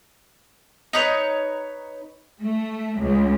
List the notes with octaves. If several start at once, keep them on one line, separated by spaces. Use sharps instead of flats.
D#4 B4 C#5
A3
C#2